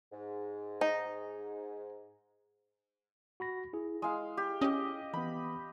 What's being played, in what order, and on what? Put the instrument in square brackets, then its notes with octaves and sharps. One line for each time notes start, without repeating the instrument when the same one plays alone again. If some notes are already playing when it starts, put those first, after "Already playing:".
[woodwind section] G#2
[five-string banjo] D#4
[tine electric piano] F#4 B5 A#6
E4 G#4
[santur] G#3 F5
G4
[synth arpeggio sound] C#4 G4 [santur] D#5
[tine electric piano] E3 B3 [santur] B5